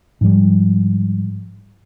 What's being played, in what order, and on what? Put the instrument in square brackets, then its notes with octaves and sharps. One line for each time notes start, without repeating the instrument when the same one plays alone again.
[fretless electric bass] G#2 F3 G3